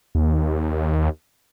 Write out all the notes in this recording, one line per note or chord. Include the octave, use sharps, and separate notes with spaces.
D#2